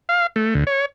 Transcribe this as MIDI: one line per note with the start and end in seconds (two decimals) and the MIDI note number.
0.09 0.27 77
0.36 0.54 57
0.54 0.64 38
0.67 0.86 73